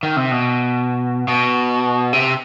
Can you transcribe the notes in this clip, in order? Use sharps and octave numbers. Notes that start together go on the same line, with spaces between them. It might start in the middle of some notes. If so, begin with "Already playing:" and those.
D#3
C3
B2
B2
C3